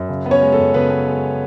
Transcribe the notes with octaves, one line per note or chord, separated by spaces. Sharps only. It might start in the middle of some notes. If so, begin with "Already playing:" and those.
Already playing: F#2
C#3
B3
C#4 C#5
G#3
A4
F#2
C#3 B3 B4
B3
G#3